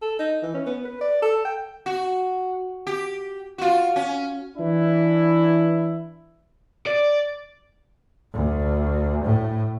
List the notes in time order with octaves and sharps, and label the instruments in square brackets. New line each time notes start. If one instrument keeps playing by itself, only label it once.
[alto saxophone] A4
D#4
E3
C#4
B3
B4
D5
A4
G5
[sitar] F#4
G4
F4 F#4
C#4
[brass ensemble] E3 D4 E4
[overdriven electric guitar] D5
[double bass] D2
A2